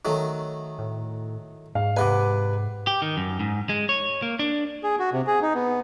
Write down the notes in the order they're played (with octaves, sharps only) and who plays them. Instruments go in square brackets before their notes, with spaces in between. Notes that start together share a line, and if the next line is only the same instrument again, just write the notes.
[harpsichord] D#3 F#3 A3
[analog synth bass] A2
[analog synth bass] G#2 [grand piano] F5
[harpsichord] C3 G#5 [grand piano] B4 F#5 D6
[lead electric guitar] G4
D#3
F#2
G#2
G#3
C#5
A#3
D4
[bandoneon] G#4
F#4
C3
G#4
D#4
B3